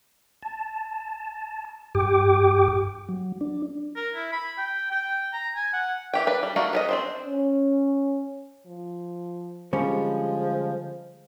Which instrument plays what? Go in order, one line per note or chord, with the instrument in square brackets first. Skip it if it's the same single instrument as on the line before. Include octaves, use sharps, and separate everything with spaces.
[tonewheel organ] A5
G2 G4 G5 D6
F#3
D4
[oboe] A#4
E4
B5
G5
G5
A#5
G#5
F#5
[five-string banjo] E3 G4 G5
D4 B4
G3
A3 A#3 D4 D#4 F#4
B3 A#4 D#5
C4 D4 C5
[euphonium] C#4
[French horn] F3
[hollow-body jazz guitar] D3 G3 C#4 [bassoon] F3 [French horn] G#3